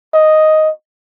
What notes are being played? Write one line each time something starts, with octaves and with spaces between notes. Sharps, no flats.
D#5